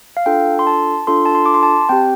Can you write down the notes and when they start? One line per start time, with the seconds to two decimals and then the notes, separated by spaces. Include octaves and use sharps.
0.17 F5
0.26 D4 F4 A4 G5
0.59 C6
0.67 A5
1.07 D4 F4 A4 C6
1.25 A5
1.35 C6
1.46 D6
1.54 C6
1.63 A5
1.89 C4 G4 G5